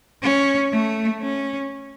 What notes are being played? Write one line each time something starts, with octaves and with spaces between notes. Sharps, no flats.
C#4
A3
C#4